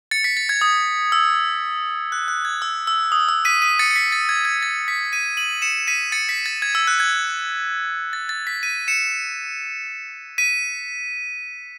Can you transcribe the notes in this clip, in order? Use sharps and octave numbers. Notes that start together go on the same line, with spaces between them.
A6 C#7
B6
A6
G#6
D#6
E6
F#6
F#6
G#6
E6
E6
D#6
E6
B6 D#7
B6 D#7
A6 C#7
C#7
B6
A6
G#6
G#6
A6
B6
B6 D#7
D#7 F#7
C#7 E7
B6 D#7
A6 C#7
B6
A6
G#6
E6
F#6
G#6
A6
A6
B6
B6 D#7
C#7 E7
B6 D#7